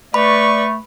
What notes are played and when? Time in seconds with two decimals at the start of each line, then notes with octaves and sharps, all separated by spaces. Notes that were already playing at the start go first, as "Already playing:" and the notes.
0.14 A3 B4 D5 B5 C#6